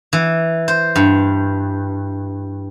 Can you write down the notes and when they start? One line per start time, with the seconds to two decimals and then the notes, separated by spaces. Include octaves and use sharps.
0.13 E3
0.68 C5
0.96 G2